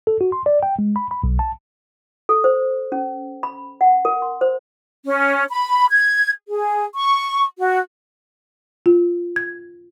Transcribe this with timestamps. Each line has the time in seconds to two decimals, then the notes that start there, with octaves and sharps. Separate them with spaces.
0.07 A4
0.21 F#4
0.32 C6
0.46 D5
0.63 G5
0.79 G#3
0.96 B5
1.11 B5
1.24 B1
1.39 A5
2.29 A4
2.44 C5
2.92 C#4
3.43 B5
3.81 F#5
4.05 A#4
4.22 C6
4.41 C5
5.05 C#4
5.50 B5
5.91 G#6
6.49 G#4
6.96 C#6
7.59 F#4
8.86 F4
9.36 G#6